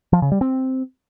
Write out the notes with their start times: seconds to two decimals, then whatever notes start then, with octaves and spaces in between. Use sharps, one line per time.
0.13 F3
0.22 C#3
0.32 G3
0.41 C4